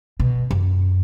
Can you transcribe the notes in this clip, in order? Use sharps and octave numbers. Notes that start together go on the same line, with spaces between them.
B2
F#2